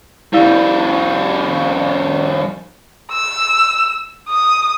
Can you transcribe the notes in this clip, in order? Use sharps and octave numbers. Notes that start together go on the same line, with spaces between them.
F2 G3 E4 F5 E6
E6
D#6